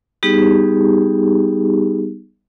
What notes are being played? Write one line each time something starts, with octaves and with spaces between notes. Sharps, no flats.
G3 B3 D#4 G4 G#4